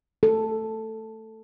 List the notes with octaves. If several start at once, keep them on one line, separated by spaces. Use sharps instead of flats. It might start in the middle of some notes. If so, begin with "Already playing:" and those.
A4